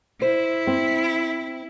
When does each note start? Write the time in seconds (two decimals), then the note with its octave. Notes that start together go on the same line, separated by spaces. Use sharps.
0.22 E4 C5
0.67 C4